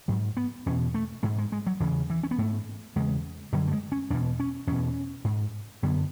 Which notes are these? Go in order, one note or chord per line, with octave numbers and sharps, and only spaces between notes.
G#2 F#3
B3
E2 B2 C#4
A3
G#2 G#3
G#3
G#3
F#3
E2 C#3 E3
E3
C#4
B3
G#2 A3
E2 C#3 G#3
F#2 D3 F#3
A3
G#3
C#4
E2 B2 D4
C#4
E2 B2 C#4
G#2
F#2 D3 B3